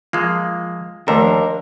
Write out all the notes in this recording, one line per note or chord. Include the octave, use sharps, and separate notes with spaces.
F3 G#3 A#3
D#2 F3 A3 D4 A#4 A5